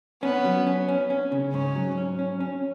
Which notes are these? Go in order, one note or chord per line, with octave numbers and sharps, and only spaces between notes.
B3 C#4
F#3
C#4
C#4
C#4
C#3
G#2 C#4
F#3
C#4
C#4
C#4